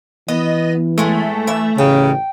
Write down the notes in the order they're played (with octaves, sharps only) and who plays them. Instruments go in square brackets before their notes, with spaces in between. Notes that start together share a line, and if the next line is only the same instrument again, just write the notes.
[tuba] E3 [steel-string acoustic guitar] B3 [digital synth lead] D#5
[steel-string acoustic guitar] A2 G#3 [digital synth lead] A3
[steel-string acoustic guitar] E3 E5
[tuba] A1 [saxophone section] C#3 [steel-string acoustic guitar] G5